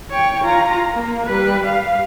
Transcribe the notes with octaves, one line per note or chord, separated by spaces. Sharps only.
C#5 G5
F4 A#5
A#3
G3 B4
F5